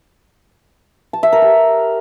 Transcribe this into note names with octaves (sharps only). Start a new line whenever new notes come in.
A5
E5
A#4
G4